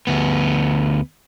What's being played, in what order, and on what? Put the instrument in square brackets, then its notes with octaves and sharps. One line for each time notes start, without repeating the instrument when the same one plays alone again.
[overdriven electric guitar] D2 B3